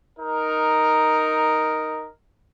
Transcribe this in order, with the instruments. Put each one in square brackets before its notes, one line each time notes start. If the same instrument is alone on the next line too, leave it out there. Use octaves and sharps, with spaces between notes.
[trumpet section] D#4 A#4